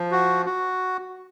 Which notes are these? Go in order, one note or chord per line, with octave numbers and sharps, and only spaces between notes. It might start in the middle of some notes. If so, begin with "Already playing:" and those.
Already playing: F3
F#4
F#4